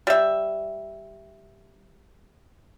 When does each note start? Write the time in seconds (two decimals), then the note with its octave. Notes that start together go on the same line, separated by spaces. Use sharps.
0.07 G3 E5